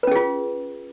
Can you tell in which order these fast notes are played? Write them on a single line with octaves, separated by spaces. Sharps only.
B4 C#4 G#4 F4